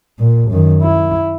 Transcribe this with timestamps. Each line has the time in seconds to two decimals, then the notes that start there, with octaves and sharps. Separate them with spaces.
0.19 A#2
0.50 F#2 D#3
0.82 E4